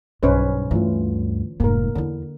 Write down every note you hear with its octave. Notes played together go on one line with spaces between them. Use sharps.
B1 G2 C#4 B4 C5
D2 G2 E3 F4
F1 G#2 A#3 A#4
E2 D3 E4